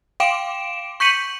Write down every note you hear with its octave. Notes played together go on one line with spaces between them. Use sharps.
F5 G5 C6 D6 D7 E7
C#6 G6 B6 C#7 D#7 F#7